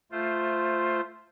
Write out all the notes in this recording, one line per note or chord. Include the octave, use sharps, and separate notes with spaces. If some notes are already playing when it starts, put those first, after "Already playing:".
A3 F4 C5